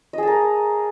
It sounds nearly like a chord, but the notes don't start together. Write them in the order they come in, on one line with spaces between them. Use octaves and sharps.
D#5 G#4 A5 A#4